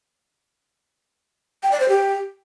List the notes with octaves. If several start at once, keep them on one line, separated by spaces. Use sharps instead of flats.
G5
D5
C5
G4